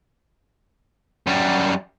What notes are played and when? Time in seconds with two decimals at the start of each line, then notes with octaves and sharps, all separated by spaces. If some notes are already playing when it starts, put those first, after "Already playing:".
1.27 F#2 G3